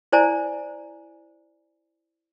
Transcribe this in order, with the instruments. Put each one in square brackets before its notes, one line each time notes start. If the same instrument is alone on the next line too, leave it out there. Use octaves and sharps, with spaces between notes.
[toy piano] E4 C5 D5 G#5 A#5